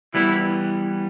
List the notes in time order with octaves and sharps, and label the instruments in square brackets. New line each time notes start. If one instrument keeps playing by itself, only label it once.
[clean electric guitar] E3 G3 B3 [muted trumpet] E4